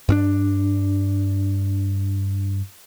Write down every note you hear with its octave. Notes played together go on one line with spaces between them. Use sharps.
G2 C#4 D4